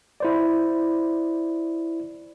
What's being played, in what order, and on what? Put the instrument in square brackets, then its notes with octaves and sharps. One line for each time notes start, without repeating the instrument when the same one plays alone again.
[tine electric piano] E4 C5 D5